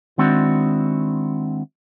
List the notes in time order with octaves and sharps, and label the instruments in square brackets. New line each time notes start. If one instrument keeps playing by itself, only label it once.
[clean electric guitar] D#3 G#3 C4 D4 E4 F#4